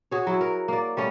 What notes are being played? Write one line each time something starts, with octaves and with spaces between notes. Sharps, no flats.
F#4 G#4 C#5
F#3 E4
A#4
A#3 D5
G3 A3 C#4